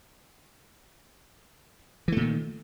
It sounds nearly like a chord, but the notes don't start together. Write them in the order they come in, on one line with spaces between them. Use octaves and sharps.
E3 A3 A#2 D#3